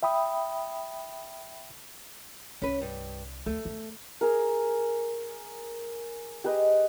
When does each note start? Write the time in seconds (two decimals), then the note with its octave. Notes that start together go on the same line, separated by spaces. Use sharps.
0.03 E5 G5 B5 D#6
2.62 C2 C#4 B4
2.82 G2
3.46 D2 A3
3.65 E2
4.21 G#4 A#4
6.44 G4 G#4 B4 D#5